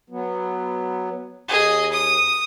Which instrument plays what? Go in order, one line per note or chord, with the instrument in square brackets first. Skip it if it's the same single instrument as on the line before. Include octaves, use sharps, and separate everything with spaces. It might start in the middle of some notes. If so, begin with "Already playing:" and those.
[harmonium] F#3 B3
[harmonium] D#2 [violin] G#4 D#5
[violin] D#6